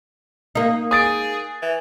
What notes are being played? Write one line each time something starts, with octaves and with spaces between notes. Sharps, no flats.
A#3 D#4
G#4 D#6 A6 D7
E3